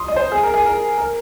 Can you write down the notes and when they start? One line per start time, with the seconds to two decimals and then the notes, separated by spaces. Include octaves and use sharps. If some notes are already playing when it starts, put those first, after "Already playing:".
Already playing: C6 D#6
0.08 D#5
0.16 C5
0.32 G#4
0.43 A#4
0.54 G#4
0.66 A#4
0.98 A#4